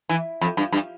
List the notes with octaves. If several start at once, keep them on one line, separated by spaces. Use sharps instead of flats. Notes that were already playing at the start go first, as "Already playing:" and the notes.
E3
F2
G2
G2